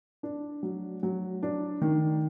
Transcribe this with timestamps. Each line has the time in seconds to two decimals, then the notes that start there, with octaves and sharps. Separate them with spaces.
0.23 D4
0.63 F#3
1.03 F#3
1.43 D4
1.82 D#3